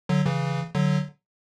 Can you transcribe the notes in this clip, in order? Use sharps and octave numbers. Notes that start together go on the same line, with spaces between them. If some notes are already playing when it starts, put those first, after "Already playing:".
D3 F#3
C#3 E3
D3 F#3